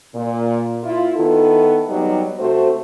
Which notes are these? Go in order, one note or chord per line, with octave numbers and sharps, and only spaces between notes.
A#2
E4 F4
D#3 B3 E4 A4
F#3 G3 B3 D#4 G4
C3 A3 F#4 C5